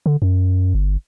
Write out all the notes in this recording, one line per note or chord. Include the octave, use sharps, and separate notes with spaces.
D3
F#2
G1